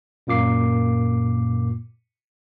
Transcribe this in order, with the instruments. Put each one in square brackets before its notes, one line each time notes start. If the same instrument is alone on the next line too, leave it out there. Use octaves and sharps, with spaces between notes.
[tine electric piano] F#2 A#2 A#3 D6 C7